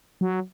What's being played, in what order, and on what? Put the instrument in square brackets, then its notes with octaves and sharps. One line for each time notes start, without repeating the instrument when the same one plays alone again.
[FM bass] F#3